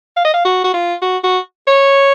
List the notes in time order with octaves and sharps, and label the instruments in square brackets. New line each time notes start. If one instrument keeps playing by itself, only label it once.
[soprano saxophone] F5
D#5
F5
F#4
F#4
F4
F#4
F#4
C#5